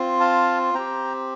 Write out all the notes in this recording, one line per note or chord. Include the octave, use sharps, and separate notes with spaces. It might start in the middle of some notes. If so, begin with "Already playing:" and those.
Already playing: C4 F4
F5 A5
C4 G4 G5 A#5